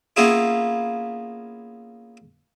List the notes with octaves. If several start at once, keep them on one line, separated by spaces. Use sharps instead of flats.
A#3 B3 C#4 E4 F4 G#4